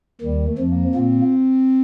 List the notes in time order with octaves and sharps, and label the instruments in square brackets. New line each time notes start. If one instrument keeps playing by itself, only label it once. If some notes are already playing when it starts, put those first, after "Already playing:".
[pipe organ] D#2 D#3 [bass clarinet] G3
[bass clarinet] A3
[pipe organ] F2 F3
[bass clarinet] A#3
[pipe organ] A#2 A#3 [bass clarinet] C4